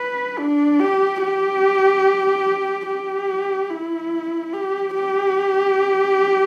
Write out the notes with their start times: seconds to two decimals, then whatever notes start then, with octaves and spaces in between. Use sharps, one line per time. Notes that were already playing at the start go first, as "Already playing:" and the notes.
Already playing: B4
0.39 D4
0.80 G4
1.22 G4
2.87 G4
3.70 E4
4.53 G4
4.94 G4